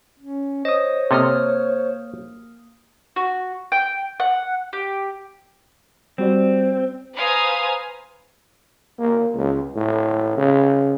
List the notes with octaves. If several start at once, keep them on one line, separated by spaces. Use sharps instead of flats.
C#4
C5 C#5 D#5 D#6
C3 A#3 A4 D#5 D#6 F6
F#4
G5
F#5
G4
G3 C4 F#4 D5
B4 C5 F5 G#5 A#5 D#6
A#3
C#2
A2
C#3